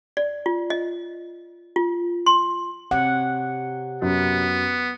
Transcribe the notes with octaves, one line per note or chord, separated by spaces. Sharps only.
D5
F4
D#5
F4
C6
C3 G4 C#5 F#5
F#2 B3